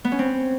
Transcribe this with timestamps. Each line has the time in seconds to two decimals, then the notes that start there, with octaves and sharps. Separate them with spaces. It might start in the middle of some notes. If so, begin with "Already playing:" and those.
0.04 B3
0.12 C#4
0.19 C4